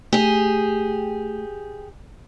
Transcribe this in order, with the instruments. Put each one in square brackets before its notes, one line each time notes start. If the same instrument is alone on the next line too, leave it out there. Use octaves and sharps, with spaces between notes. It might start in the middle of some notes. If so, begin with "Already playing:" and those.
[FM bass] A3 [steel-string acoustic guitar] G4 G#4